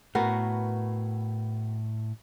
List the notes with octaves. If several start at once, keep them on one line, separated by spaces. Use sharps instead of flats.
A2 B3 F#4 A#4